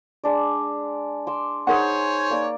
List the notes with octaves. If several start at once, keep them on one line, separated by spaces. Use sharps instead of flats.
G#3 D4 D5
C6 D6 E6
D#4 G#4 A#4 C5 C#5 F#5 G#5
A#3 D5 D6